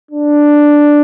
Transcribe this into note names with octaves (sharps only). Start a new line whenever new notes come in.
D4